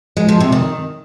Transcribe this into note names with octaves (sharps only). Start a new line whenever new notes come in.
G#3
F3
C3
D#3